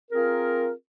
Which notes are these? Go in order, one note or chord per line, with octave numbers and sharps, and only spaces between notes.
C4 F4 G#4 A#4